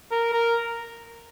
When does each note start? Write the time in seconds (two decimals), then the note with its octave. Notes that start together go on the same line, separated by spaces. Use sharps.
0.12 A#4
0.33 A#4